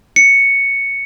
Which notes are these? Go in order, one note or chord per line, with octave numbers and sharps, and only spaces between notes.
C#7